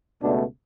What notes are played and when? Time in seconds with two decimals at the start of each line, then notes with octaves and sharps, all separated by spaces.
0.22 C#2 B2 A3 D4